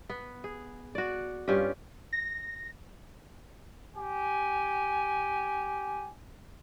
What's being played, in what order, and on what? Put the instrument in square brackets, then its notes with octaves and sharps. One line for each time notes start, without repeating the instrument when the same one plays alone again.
[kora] B3
G#4
F#4 D5
G2 C#4 F4 G4
[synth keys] A#6
[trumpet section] G4 G#5